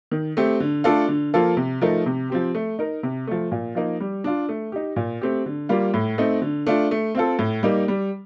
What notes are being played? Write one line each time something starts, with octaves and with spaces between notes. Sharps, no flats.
D#3
A3 C4 G4
D3
A3 D4 F4 A4
D3
F3 A#3 F4 A4
C3
F3 A3 D#4 A#4
C3
F3 C4 G4
A3
D#4 A#4
C3
F3 A3
A#2
F3 A#3 D#4
G3
D4 F4
A3
D#4 G4
A#2
A3 C4 G4
D3
G3 A#3 F4
A2
A3 C4 D#4
D3
A3 D4 F4
A3
C4 F4 A4
A2
G3 A#3 D#4
G3